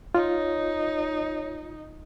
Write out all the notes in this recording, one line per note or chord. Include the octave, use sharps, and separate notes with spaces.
D#4 F4 C#5